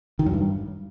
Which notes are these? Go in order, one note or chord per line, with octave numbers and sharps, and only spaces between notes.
D#3
F#2
G2